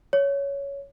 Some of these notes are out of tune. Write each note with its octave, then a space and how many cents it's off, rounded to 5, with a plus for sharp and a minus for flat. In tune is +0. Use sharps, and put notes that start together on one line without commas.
C#5 +10